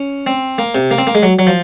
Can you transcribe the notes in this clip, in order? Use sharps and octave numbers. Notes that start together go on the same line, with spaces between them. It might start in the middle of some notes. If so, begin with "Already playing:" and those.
Already playing: C#4
C4
A#3
C3
A#3
C4
A#3
G#3
F#3
F#3
F3